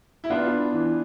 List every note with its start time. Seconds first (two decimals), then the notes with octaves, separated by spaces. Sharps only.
0.24 E4
0.30 B3 D4 F4
0.72 E3